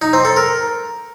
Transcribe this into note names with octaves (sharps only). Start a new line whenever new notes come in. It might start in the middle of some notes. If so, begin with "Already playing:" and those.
D#4
C4
A4
A#4